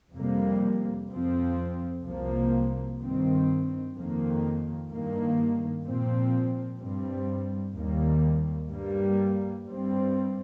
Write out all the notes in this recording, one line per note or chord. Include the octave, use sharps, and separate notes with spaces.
F2 C3 G3 A#3
F2 F3 C4
C2 C3 F3 A#3
G2 D#3 C4
F2 D#3 A#3
G2 D#3 A#3
A#2 F3 C4
G2 G3 C4
D#2 D#3 G3 A#3
G2 G3 A#3
G2 G3 C4